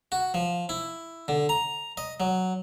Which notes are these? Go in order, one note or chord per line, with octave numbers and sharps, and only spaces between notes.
F#4
F3
E4
D3
A#5
D#5
F#3